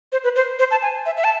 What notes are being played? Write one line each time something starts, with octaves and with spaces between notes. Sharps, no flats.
C5
B4
C5
C5
A5
G#5
E5
E5
A5